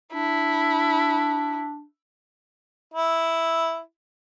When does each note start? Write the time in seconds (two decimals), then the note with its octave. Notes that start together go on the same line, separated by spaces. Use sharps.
0.14 D4 E4
2.94 E4